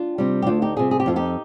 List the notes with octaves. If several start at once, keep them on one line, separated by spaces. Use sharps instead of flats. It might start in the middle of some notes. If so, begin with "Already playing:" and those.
Already playing: D4 F4
C3 G3
G4
D2 D4 F4
D#4 G4
C3 G3 F4 G#4
G#4
G4
F2 F4
D#4 G4